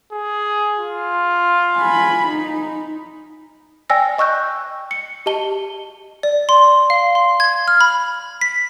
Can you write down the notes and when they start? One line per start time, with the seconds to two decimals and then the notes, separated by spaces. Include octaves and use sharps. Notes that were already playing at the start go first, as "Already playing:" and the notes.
0.12 G#4
0.79 F4
1.77 G#5 B5
2.27 D#4
3.90 D5 G5 G#5 E6 A#6
4.18 D#5 C#6 E6 F#6 G6
4.91 C#7
5.26 G4 D#5 A5 G7
6.23 D5
6.49 C6
6.90 F5
7.15 C6
7.40 G#6
7.68 F6
7.81 B5
8.41 B6